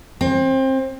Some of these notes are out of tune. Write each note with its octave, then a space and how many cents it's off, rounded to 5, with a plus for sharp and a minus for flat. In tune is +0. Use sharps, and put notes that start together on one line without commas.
C4 +25